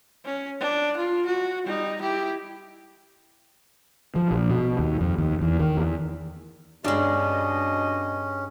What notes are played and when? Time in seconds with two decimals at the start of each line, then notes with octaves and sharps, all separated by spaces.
0.25 C#4
0.60 D4
0.97 F4
1.26 F#4
1.65 G3 D#4
2.01 E4 G4
4.16 F3
4.31 A#1
4.50 B2
4.79 D#2
5.01 F2
5.18 D#2
5.41 E2
5.59 D#3
5.77 E2
6.84 G2 B2 G#3 C#4 D4 D#5